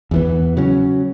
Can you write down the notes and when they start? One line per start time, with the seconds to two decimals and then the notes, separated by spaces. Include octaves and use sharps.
0.11 E2 E3 B3
0.57 C#3 F#3 C#4